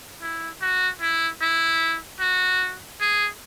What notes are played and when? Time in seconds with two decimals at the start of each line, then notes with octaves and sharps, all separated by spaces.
0.22 E4
0.61 F#4
1.01 E4
1.41 E4
2.20 F#4
3.00 G#4